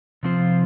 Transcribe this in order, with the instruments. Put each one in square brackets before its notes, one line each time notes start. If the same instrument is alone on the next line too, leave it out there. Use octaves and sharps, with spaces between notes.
[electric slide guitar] C3 F3 C4 F4 C5